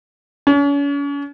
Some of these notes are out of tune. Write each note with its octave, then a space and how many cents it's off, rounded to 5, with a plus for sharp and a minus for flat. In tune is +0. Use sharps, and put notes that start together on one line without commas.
C#4 +40